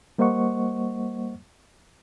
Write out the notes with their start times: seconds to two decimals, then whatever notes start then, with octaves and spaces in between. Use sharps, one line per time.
0.18 G3 A#3 C5 D#5 F#5 C#6